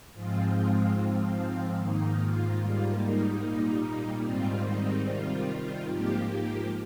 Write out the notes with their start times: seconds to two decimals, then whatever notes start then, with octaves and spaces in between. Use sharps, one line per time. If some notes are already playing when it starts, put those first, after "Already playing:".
0.14 G#2 F3 G#3 C4 F4
0.55 F4
0.95 G#2 F3 C4
1.77 G#2 D#3 A#3 D#4
2.18 F4
2.59 G#2 G3 A#3 F4
3.00 D#4
3.41 A#2 G3 A#3
4.22 G#2 D#3 G3 C4 F4
4.63 D#4
5.04 C3 D#3 G3 F4
5.45 F4
5.86 G#2 F3 A#3 G4
6.26 G4